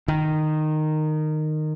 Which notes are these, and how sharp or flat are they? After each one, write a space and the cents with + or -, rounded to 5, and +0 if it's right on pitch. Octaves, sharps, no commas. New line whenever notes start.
D#3 -15